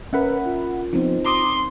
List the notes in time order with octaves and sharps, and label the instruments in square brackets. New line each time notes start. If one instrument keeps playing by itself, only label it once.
[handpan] C#4 A#4 [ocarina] B4 [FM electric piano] E5 F#5 B5
[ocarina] F4
[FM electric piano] F3 B3 [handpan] C4 D#4
[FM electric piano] A#5 D6 D#6 [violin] C6